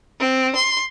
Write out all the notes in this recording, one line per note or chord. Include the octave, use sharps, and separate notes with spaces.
C4
C6